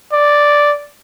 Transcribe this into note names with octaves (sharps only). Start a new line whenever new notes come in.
D5